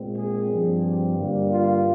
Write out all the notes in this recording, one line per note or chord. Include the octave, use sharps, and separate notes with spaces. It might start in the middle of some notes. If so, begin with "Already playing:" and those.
Already playing: A#2 G#3 C4
G#4
G2 F3 C4
G4
G2 D3 G3 A#3
F4